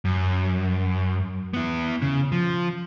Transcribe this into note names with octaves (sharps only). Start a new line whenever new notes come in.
F#2
B3 E4
C#3
F3